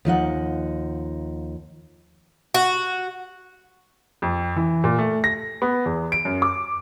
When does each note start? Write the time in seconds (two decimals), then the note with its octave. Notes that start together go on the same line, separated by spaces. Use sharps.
0.05 D#2 F3 D#4 F#5
2.54 F#4
4.22 F2
4.56 E3
4.84 A#2
4.99 A3
5.24 A#6
5.62 B3
5.86 E2
6.12 D7
6.25 F#2
6.42 D6